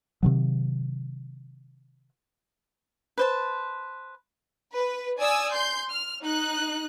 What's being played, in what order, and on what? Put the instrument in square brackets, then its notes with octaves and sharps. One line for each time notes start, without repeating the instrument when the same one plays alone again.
[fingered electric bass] C3 D#3 F#3
[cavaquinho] B4 C5 A5
[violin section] B4
D5 G#5 D#6 E6
C6 G6
F6
D#4 F#6